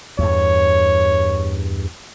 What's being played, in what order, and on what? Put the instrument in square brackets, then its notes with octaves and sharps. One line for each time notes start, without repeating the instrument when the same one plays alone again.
[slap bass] E2 G2 [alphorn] C#5